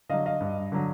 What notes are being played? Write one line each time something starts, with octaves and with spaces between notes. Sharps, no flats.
D3 F#3 D#5 F5
D#5 F5
G2
D3 F#3